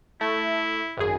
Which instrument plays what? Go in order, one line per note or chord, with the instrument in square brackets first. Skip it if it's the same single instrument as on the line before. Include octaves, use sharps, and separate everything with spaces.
[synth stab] A3 [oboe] E4
[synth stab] G#1 F#2 G#4